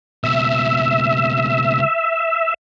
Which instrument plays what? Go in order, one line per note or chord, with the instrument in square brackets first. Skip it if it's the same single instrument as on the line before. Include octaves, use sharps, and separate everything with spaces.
[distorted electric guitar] C#2 B2 [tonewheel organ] E5